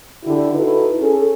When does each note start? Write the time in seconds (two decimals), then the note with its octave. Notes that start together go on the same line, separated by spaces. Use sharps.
0.25 D3 E4 G4
0.54 D#4 E4 F#4 A4 B4
1.00 C#4 G#4 A4